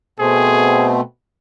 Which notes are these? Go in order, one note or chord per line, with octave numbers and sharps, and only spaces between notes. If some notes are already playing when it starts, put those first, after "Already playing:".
B2 A3 C4 G#4